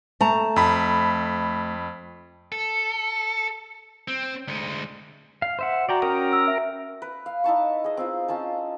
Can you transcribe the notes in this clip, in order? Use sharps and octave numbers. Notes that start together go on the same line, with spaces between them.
A3 A5 A#5
F2 B5
A4
C4
D2 G#3
F5
C5 E5 F#5
F#4 D5 G5 A#5
C#4 A#4 G5 D#6
E6
E5
B4
F5
D#4 E4 A5 C#6
G#4 D#5
C4 F4
C#4 F4 G#5 A5